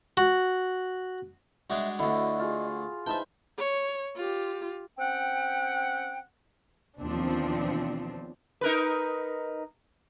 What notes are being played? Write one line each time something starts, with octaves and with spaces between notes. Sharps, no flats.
F#4
G3 G#3 D4 F#4 E5
D2 D3 E4 D#5
F4 G#4
E3 D#4 C5 E5 G5 A5
C#5
F4 G4
C4 C#4 F#5 G5
D#2 B2 E3 F3 C4 D4
D#4 A#4 B4